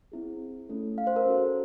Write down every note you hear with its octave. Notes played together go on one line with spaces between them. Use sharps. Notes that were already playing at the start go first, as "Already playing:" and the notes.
C4 E4 G#4
A3 C#4 E4 A4
F5
C5
A#4
C#4 F#4 A4